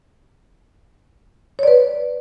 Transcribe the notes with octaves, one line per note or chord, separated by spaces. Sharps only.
B4 C#5 D5